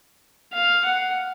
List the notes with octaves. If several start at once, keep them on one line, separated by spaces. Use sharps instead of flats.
F5
F#5